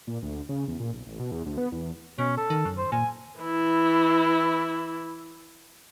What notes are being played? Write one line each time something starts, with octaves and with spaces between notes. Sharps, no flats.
A#2
D2
C#3
E2
A#2
B1
A1
B2
E2
D2
B3
E2
B2 C#4
A4
D#3
F#2
C5
A#2 G#5
E3 E4